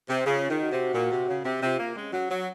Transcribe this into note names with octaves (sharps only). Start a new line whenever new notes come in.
C3
C#3 F4
D#3
F#4
C3
A#2
C3
C#3
C3
C3 F4
A#3
G#3 C#4
F#3
F#3